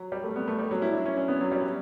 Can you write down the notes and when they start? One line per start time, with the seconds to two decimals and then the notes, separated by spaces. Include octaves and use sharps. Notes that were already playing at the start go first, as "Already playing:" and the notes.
Already playing: F#3
0.12 G3
0.24 A3
0.36 B3
0.48 A3
0.59 G3
0.71 F#3
0.82 E4
0.93 D4
1.06 C#4
1.17 C#4
1.28 B3
1.41 F#3
1.52 G3